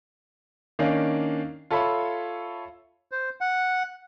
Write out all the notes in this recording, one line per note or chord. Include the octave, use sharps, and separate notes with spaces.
D#3 A#3 C#4 D4 F5
F4 A4 C#5 E5 B5
C5
F#5